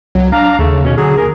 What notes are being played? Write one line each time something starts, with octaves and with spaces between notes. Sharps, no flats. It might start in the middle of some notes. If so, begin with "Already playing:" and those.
C2 F#3
D4 F5 A#5
D#2 C#3 A3
B2 C#4
D3 F#3 G#4
D#2 A#4